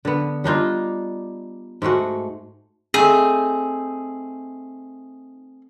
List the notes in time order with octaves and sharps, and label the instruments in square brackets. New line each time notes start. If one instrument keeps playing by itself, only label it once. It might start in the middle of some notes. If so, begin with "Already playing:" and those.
[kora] D3 B3
G3 D4 D#4 F4
G#2 G#3 A3 F#4
[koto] A3 C4 D#4 [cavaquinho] G#4